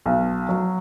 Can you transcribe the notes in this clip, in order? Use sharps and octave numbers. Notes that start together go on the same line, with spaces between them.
B1
F#3